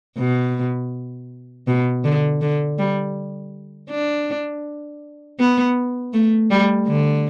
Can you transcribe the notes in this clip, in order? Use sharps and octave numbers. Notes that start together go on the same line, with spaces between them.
B2
B2
D3
D3
G3
D4
B3
A3
G3
D3